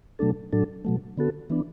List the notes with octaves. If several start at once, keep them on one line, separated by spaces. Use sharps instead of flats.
B2 F#3 A3 D4 A4
A2 F#3 D4 A4
B2 F#3 A3
D3 B3 F#4 A4
E3 B3 D4